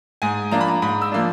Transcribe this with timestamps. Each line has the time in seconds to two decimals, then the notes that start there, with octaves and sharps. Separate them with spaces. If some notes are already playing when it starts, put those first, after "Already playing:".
0.22 G#2 G#5
0.51 F3 A#3 D4 A#5
0.61 B5
0.68 A#5
0.82 G#2 B5
1.02 E6
1.12 F3 A#3 D4